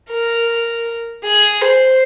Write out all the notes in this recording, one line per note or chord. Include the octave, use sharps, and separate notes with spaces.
A#4
G#4
C5